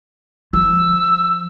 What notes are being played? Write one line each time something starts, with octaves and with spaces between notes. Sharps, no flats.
F3 E6